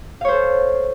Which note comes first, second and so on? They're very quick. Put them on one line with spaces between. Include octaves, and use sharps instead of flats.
F5 C#5 C5 A4